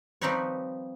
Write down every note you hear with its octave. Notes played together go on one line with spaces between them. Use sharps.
F3 G3 C4 D#4 B4 C#5